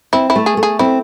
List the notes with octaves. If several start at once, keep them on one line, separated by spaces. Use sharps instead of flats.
C4 E4
E4
A3
G#4
A3
G#4
C4 E4